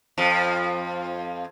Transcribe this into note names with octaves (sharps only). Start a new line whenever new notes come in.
F2 F3